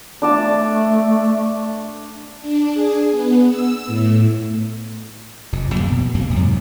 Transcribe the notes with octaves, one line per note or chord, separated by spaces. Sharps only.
A3 D4 D5 A5
D4
G#4
B3
E6
A2
F1 F2
D1 F2 A#3
B2
E1 F2 C3 A#3
F2 G#2 F#3